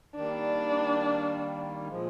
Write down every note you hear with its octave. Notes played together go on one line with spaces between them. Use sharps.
D#3 G3 A#3 D4
A#2 F3 G#3